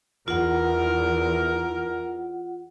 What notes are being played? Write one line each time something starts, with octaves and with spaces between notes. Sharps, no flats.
E2 E3 F4 A#4 F#5